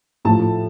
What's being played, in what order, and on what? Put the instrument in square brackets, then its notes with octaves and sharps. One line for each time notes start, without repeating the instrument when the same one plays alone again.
[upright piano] A2 F3 A3 A5